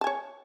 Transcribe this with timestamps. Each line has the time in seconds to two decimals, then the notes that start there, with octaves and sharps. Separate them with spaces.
0.01 A5
0.04 G#5
0.07 C#5